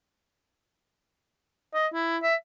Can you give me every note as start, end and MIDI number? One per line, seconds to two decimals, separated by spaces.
1.74 1.87 75
1.94 2.18 64
2.23 2.35 76